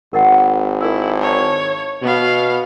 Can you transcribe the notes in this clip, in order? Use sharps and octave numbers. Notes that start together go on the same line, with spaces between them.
G#1 A#4 D#5 F#5
E4 A4 A#4 E6
C#5 D5 A5
B2 B3 F5